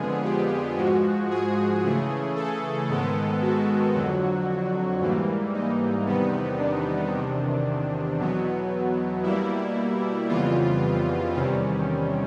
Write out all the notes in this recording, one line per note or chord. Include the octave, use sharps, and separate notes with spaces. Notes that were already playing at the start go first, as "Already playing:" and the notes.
Already playing: F2 D3 F3 G#3 B3 G#4
G4
G#2 F3 G#3 F#4
G#4
C#3 E3 A3
A4
G#2 D#3 G#3 B3
F#4
F2 D3 F#3
G#2 E3 G3 A#3
D#4
E2 C3 D#3 G3 B3
D4
E2 C3 D#3
E2 B2 F#3 B3
B2 G3 A#3 E4
F2 C#3 E3 G3 B3 F4
E2 C3 D#3 G3 C#4